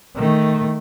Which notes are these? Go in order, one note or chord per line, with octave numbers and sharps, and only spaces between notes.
D#3 A3